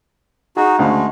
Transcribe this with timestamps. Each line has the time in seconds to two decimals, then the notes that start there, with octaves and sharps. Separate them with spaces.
0.57 D#4 F#4 G#4
0.79 D2 C#3 G#3 A3 F5